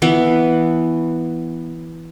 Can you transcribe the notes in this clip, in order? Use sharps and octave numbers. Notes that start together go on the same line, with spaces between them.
E3 B3